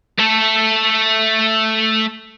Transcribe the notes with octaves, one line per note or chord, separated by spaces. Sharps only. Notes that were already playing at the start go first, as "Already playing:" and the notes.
A3 A4